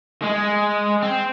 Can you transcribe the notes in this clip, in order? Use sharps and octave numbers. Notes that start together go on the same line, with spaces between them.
G#3
C4